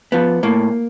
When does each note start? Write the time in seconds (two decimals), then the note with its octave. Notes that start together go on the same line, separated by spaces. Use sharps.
0.12 F3 B3
0.43 A2 A#3